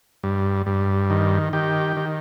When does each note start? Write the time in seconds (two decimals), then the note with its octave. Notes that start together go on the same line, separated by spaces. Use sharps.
0.24 G2
0.66 G2
1.10 D#3
1.53 D#3 G4
1.97 D#3